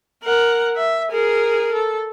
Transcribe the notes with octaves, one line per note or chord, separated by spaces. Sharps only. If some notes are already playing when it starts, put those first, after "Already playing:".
A#4 F#5
E5
G#4 A#4
A4